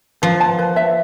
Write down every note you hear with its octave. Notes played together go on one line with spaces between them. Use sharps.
F3 B4
A5
B4
E5